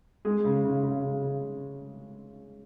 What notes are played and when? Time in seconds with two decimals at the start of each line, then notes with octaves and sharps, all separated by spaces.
0.25 G#3 G#4
0.45 C#3
0.64 C#3
0.83 C#3
1.02 C#3
1.22 C#3